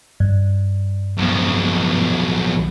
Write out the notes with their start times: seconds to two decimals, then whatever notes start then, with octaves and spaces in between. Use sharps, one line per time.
0.20 G2
1.17 B1 F3